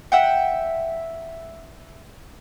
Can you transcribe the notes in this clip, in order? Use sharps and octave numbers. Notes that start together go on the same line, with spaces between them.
E5 F#5 G5